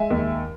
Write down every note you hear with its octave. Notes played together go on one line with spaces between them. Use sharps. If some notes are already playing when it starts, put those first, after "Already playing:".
Already playing: G#3 E5 G#5
D#2